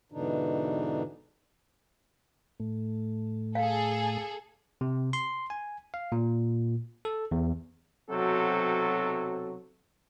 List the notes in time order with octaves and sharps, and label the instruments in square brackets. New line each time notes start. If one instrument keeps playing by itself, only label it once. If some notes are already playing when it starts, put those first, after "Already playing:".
[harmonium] G#2 B2 D3 E3 D4 D#4
[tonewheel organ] A2 A3
[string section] G#4 A4 [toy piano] F5
[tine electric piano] C3
C6
G#5
F5
A#2
A4
E2
[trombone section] B1 C3 F#3 C4 F#4 A4